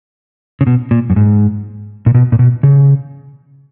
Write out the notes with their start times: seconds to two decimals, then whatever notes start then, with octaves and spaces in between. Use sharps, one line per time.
0.61 C#3
0.67 B2
0.91 A#2
1.10 F#2
1.16 G#2
2.06 A#2
2.15 B2
2.32 A#2
2.39 B2
2.63 C#3